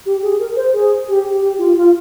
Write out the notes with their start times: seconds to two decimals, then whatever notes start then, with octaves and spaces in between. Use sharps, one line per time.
0.06 G4
0.22 G#4
0.40 A#4
0.56 C5
0.73 G#4
1.08 G4
1.41 G4
1.58 F4
1.76 F4